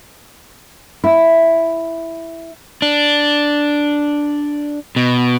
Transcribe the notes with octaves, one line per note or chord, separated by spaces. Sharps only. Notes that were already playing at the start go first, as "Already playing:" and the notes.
E4
D4
B2